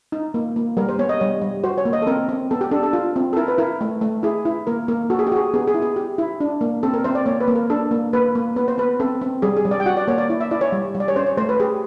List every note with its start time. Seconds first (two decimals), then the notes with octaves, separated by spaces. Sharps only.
0.12 D#4
0.34 A#3
0.56 A#3
0.77 G3 A#4
0.89 C5
0.99 B3 C#5
1.09 D#5
1.20 G3 C#5
1.42 G3
1.64 F#4 C5
1.78 C#5
1.85 A#3
1.93 D#5
2.02 A4
2.07 C4 A#4
2.29 C4
2.51 B3 A4
2.61 G4
2.71 D4 A4
2.83 A4
2.93 F4
3.16 C4
3.33 A4
3.37 E4 A#4
3.48 B4
3.58 E4 A#4
3.81 A3
4.01 A3
4.23 E4 G#4
4.45 E4
4.67 A#3 A#4
4.88 A#3 A#4
5.10 F#4 A4
5.19 G#4
5.27 G4
5.32 F#4 G#4
5.54 B3 G#4
5.68 G#4
5.74 E4
5.82 G#4
5.96 G4
6.18 E4
6.40 D4
6.61 A#3
6.83 C4 A4
6.94 A#4
7.04 C4 C5
7.15 D5
7.26 A#3 C#5
7.41 B4
7.48 A#3
7.55 A#4
7.70 D4 A4
7.91 A#3
8.13 A#3 B4
8.35 A#3
8.56 B3 B4
8.68 C5
8.78 B3 B4
9.00 C4 A4
9.21 C4
9.42 G3 G#4
9.57 G#4
9.65 G3
9.71 D5
9.80 G5
9.86 F#4 F#5
9.97 D5
10.08 A#3 C#5
10.18 D5
10.30 E4
10.40 E5
10.51 E4 D5
10.61 C#5
10.72 G3
10.95 G3
11.00 D5
11.08 C#5
11.16 C#4 C5
11.26 C#5
11.37 A3 C5
11.49 B4
11.60 G4 G#4